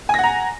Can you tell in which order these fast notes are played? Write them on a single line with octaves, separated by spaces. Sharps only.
G#5 A#6 F#5 A#5